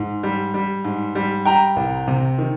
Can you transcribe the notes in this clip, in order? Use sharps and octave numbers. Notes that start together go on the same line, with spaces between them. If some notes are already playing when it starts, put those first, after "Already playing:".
Already playing: G#2
G3
G3
G#2
G3
G3 G5 A#5
C2
C3
D#3